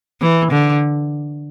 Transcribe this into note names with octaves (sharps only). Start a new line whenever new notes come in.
E3
D3